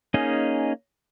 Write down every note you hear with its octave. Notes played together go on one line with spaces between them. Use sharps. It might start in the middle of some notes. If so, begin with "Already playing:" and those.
A#3 C#4 D#4 G#4 D#5